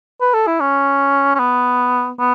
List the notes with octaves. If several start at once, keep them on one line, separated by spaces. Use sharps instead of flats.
B4
A4
E4
C#4
C#4
B3
B3